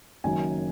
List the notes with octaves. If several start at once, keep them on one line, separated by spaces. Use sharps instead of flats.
F#1 F#2 D#3 F#3 G#5